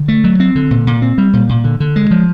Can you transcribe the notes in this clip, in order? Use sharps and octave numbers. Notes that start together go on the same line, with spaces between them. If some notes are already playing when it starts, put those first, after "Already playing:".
Already playing: D3
A3
F#3
C4
D3
A#2
A#2
C4
G3
A#2
A#2
D3
D3
G#3
F3